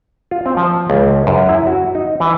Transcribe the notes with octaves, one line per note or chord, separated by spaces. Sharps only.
F4
C4
F3
C#2
F#2
E4
F#4
D#4
E3